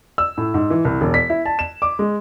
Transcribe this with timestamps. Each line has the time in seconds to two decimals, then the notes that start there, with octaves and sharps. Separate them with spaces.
0.18 E6
0.38 A2
0.54 G#2
0.70 E3
0.85 C2
1.01 E1
1.14 B6
1.30 E4
1.46 A5
1.59 E7
1.82 D6
1.99 G#3